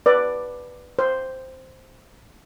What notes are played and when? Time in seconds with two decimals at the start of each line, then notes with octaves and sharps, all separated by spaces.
0.06 B4 D5
0.99 C5